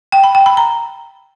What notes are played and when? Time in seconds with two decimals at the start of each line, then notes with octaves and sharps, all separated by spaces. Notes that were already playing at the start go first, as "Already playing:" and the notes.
0.12 G5
0.24 B5
0.35 G5
0.46 B5
0.57 A#5